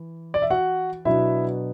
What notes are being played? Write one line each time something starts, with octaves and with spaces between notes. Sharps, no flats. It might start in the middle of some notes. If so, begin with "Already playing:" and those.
Already playing: E3
D5
E5
F#4 F#5
B2 F#3 B3 D4 E4 E5